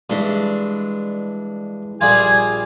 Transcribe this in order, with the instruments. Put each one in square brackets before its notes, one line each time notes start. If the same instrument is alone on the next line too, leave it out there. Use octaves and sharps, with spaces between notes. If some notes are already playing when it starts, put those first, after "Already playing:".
[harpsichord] G2 [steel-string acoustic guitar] E3 G#3 D4
[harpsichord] A#1 G3 F4 [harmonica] G#4 [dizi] G#6